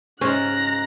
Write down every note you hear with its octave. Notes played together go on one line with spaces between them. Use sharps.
G#2 C#3 G#3 C#4 C5 A#5 F#6